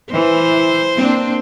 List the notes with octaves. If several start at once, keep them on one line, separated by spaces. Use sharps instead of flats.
E3 C5
A#3 C4 D4